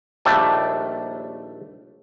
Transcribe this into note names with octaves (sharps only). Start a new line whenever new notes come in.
A#1 D#2 G3 A3 D4 A4